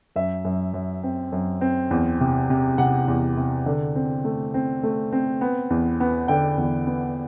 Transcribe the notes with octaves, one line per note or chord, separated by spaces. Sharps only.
F#2 E5
F#2
F#2
C4
F#2
C4
E2
C3
C3
C3 F#5
E2
C3
D3
C4
A3
C4
A3
C4
B3
E2
B3
D3 G5
E2
B3